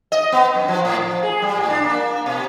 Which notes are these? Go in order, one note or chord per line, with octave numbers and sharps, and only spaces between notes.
D#5
B3
F#2
F3
A2
F3
G#4
G3
A2
D4
A#3
B2